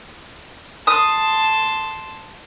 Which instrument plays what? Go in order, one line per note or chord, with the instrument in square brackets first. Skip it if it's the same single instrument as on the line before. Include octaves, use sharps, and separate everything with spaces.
[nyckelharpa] A5 C6 [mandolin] D#6